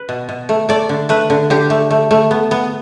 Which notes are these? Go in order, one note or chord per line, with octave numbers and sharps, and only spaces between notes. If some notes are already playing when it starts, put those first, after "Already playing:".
Already playing: B4
B2
B2
A3
A3 D5
D3
A3 B4
D3
D3 G4
A3
A3
A3
B3
B3